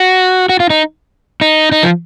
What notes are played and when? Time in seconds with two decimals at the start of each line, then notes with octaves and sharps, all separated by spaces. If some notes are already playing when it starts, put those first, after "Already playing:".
Already playing: F#4
0.49 F#4
0.60 F4
0.70 D#4
1.41 D#4
1.72 D#4
1.83 F3